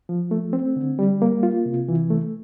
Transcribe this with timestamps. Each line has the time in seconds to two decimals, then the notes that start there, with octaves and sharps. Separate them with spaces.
0.09 F3
0.31 A3
0.53 C4
0.76 D3
0.99 G3
1.22 A#3
1.43 F4
1.66 C3
1.88 E3
2.11 A3